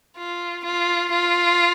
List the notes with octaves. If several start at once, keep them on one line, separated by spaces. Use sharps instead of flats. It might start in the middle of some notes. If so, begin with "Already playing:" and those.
F4
F4
F4